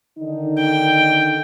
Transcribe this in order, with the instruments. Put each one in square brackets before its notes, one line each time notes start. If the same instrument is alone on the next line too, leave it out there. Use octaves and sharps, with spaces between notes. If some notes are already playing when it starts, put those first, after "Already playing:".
[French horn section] D3 D#3 D#4
[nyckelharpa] G5